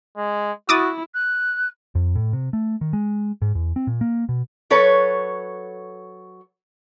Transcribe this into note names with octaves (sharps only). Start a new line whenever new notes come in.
G#3
E4 F#4 D6 D#6 A6
F#6
F2
A2
C3
A3
D#3
G#3
G#2
E2
C4
A#2
A#3
B2
F#3 A4 B4 C#5